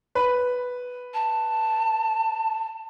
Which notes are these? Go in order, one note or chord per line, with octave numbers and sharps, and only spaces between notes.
B4
A5